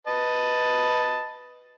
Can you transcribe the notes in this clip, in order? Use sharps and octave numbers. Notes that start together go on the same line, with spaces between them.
B4 D#5 A5